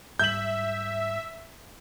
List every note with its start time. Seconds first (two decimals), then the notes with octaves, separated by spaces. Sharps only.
0.19 G#2 G3 E5 G6 F#7